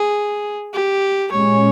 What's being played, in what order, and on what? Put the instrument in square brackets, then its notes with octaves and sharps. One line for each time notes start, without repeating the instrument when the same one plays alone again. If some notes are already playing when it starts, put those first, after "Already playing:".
Already playing: [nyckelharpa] G#4
G4
[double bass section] A#2 G#3 C#4 [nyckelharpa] C#5